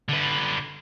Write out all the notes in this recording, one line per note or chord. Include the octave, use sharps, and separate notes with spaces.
D3 B4